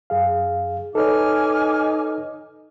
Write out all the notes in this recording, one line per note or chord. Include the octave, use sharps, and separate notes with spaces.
F#2 G#4 F5
D#4 A4 B4 C#5 G#5 D6 F6